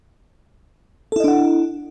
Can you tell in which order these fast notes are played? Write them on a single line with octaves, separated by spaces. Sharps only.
A4 E4 D#5 D4 F#5